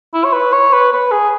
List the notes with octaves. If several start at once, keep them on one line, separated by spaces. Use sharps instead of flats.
E4
C#5
B4
C#5
B4
B4
G#4